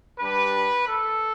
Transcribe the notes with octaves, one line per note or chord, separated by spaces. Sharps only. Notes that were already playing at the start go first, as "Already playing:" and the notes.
G3 D4 G4 B4
A4